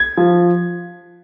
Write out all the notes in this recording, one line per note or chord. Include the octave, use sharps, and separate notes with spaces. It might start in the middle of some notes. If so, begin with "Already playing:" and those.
Already playing: G#6
F3